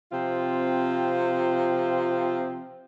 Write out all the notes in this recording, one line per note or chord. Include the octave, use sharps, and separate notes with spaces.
C3 F3 C4 F4